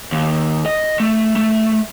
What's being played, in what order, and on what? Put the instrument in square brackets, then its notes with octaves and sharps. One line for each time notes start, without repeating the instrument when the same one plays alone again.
[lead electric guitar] D#2
D#5
A3
A3